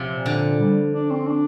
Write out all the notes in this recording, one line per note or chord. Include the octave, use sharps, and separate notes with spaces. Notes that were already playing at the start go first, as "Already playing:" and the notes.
Already playing: C3 F3
A#2
D3
G3
D4
C4
D4